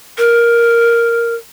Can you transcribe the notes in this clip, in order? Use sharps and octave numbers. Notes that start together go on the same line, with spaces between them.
A#4